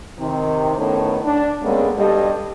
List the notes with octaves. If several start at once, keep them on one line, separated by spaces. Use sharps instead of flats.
C3 D#3
E2 A2 D#3 A3 B3 C#4
D4
D3 G3 G#3 A#3 B3 C#4
G2 B2 G3 G4 A4 D#5